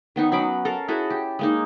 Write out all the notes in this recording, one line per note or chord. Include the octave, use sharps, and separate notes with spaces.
D#3 B3 D#4 C#5
F#3 C#4 B5 D6
A4 A#4 F5 A#5
E4 F#4 G#4 A4
G4
G#3 A#3 D#4